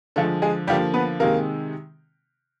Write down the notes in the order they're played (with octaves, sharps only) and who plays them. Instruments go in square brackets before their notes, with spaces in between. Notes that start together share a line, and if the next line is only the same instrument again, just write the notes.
[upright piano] D3 F3 G#3 A3 A4
G#3 G#4
D3 F3 G3 A#3 G4
B3 B4
C3 D#3 G#3 A#3 A#4